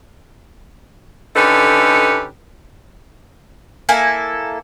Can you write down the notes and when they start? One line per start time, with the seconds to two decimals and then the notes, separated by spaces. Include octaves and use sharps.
1.36 D3 C#4 D#4 G4 A4 B4
3.89 A#3 E4 A4 G#5